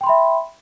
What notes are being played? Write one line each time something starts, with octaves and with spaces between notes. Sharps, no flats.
E5 G5 B5 C6